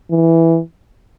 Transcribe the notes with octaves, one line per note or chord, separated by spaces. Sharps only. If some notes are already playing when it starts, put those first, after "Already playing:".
E3